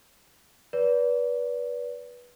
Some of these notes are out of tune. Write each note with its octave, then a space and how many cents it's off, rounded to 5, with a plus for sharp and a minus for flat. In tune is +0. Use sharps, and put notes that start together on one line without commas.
B4 -20 D5 -30